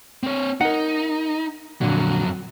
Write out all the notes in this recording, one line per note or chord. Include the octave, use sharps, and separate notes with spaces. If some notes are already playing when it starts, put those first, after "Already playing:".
C4 C#5
D#4 A#4 F#5
F2 A#2 D3 F#3